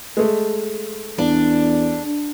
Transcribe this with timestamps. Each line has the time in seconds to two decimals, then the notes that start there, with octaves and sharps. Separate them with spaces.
0.17 G#3 A3
1.18 E2 D4